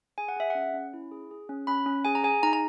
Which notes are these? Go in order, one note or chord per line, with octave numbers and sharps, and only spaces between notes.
G#4 G#5
F#5
G#4 E5
C#4 F#5
C#4
E4
G#4
G#4
C#4
C#4 B5
C#4
G#4 G#5
A#5
G#4 G#5
D#4 A#5
A#5